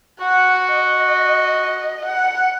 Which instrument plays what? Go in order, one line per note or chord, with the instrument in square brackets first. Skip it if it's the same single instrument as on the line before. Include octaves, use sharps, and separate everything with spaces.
[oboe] F#4 [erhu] F#5
[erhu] D#5
F#5